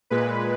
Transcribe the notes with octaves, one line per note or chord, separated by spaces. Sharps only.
A#2 G#3 B4